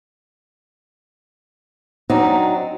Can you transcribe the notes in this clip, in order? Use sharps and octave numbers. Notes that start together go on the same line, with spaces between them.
F#3 C4 D4 D#4